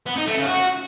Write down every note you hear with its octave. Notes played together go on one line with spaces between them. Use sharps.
B3
D#4
A3
C#3
F#4